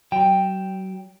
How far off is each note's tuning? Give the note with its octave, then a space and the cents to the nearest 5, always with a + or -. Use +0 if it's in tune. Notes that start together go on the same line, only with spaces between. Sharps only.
F#3 +35 G5 +0